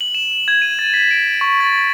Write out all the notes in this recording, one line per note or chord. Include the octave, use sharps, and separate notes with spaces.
F#7
E7
G#6
D#7
A6
B6
D7
C#6
A6